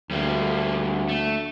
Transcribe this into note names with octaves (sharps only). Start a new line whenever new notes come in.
D2 G3 A#3
A3